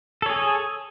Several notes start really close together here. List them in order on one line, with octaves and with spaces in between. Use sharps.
A4 C#5 G#4